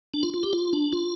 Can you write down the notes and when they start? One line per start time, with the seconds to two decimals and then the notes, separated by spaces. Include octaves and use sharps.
0.14 D4
0.23 F4
0.34 F4
0.43 G4
0.53 F4
0.73 D4
0.93 F4